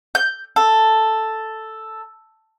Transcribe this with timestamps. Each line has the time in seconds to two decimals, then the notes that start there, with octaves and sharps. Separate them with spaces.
0.15 G6
0.56 A4